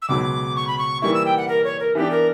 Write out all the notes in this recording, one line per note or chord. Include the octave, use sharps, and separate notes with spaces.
E6
C#2 B2 F#3 D6
C#6
B5
C#6
E3 G3 A#3 E4 C#6
E6
G5
F#5
A#4
C#5
A#4
E3 B3 D4 G4
A#4